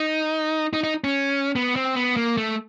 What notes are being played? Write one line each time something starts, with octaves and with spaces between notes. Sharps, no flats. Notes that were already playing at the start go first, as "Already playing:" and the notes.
Already playing: D#4
D#4
D#4
C#4
B3
C4
B3
A#3
A3